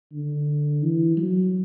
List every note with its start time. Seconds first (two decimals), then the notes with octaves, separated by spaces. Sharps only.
0.13 D3
0.83 E3
1.17 F#3